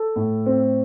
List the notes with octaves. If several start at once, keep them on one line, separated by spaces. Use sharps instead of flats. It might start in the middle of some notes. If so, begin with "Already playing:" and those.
Already playing: A4
A2
C4